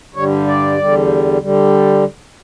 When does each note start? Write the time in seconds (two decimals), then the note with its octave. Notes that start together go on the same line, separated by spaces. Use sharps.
0.14 G2 D3 G3 C#5
0.47 D5
0.78 E2 D3 G3
1.42 D3 G3